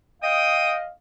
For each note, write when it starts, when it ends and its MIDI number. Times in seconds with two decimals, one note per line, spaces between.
0.23 0.89 75
0.23 0.89 77
0.23 0.74 79
0.23 0.74 87